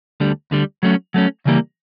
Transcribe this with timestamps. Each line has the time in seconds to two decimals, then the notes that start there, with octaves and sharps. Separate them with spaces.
0.20 D2 D3 G3
0.51 D2 D3 G3
0.83 F#3 A3 C#4
1.14 F#3 A3 C#4
1.45 C#3 E3 G3 A#3